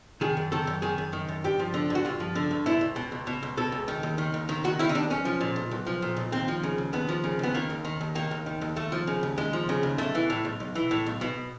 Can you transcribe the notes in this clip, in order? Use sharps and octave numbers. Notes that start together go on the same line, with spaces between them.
D#3 G#4
F#2
D#3 A4
F#2
D#3 G#4
F#2
D#3
F#2
G2 G4
F3
D3
G2 F#4
G2 F4
F3
D3
G2
B2 E4
C#2
B2
C#2
B2
C#2
B2 A4
C#2
D#3
D#2
D#3
D#2
D#3
D#2 F#4
D#3 E4
D#4
D#2 D4
B1 C#4
F3
A#2
B1
B1
F3
A#2
B1
D#2 C4
F3
C#3
D#2
D#2 B3
F3
C#3
D#2 B3
D#3 A#3
D#2
D#3
D#2
D#3 A#3
D#2
D#3
D#2
D#2 A3
F3
C#3
D#2
D#2 G#3
F3
C#3
D#2
B1 A3
E3
A2
B1
B1
E3
A2
B1
B2